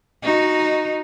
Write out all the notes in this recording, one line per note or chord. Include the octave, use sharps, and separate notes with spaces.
D#4 F#4